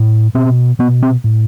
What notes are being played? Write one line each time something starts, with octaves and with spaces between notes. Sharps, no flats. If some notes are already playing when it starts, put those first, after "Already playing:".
Already playing: A2
B2 C4
B2 B3
C4
A2